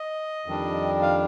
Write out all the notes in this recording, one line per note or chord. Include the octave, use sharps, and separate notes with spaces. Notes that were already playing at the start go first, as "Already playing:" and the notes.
Already playing: D#5
F2 D#3 G3 D4
F5